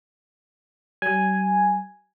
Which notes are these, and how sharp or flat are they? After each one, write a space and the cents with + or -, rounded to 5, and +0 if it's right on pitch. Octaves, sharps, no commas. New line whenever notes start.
G3 -45 G#5 +0